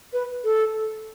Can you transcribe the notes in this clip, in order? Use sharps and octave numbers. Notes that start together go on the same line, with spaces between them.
B4
A4